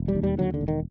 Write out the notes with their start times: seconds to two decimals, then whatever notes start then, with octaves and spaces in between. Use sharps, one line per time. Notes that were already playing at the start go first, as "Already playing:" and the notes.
Already playing: E1
0.08 G3
0.15 D#2
0.23 G3
0.38 D3 F#3
0.54 D3
0.61 E1
0.68 D#3